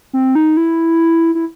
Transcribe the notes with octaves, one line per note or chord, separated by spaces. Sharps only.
C4
D#4
E4
E4